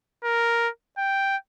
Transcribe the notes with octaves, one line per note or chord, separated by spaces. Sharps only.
A#4
G5